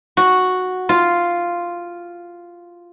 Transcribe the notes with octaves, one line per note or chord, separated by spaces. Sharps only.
F#4
F4